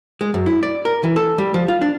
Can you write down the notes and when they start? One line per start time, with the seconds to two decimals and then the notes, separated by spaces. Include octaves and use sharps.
0.21 G#3
0.34 F#2
0.46 E4
0.63 D5
0.85 A#4
1.04 E3
1.16 A4
1.38 G3
1.54 F3
1.68 F4
1.81 D4